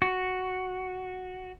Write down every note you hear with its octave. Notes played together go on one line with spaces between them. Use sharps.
F#4